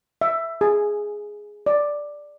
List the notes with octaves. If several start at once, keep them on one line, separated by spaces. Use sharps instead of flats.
E5
G#4
D5